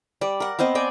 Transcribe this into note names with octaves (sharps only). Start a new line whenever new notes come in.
G3 D5
A#4 F#5
B3 C4 C5 D#5
D5 G5 G#5